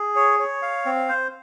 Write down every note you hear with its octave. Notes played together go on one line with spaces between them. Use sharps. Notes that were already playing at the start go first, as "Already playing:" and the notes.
Already playing: G#4
C#5
C#5
F5
C4
C5